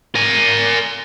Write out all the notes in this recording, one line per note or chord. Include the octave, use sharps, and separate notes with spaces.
A#4 G#5